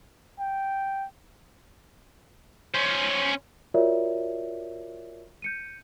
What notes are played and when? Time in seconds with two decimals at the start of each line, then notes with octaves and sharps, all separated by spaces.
0.39 G5
2.74 C#4 C5
3.74 F4 F#4 A#4 C#5 D5 E5
5.42 G6 C#7 D#7